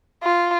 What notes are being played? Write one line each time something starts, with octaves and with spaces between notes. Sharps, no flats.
F4